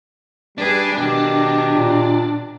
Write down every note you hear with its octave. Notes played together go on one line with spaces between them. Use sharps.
G3 D4 G#4 B4
B2 D#3 G4
A#2